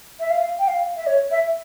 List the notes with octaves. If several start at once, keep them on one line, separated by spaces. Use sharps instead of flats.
E5
F5
G5
F5
E5
C#5
E5